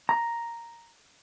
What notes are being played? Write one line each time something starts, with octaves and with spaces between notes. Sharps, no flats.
A#5